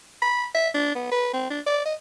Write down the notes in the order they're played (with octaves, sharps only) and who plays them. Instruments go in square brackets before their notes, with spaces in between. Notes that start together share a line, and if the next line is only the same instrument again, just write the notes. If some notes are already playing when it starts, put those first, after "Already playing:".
[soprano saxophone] B5
E5
D4
B3
B4
C4
D4
D5
D#5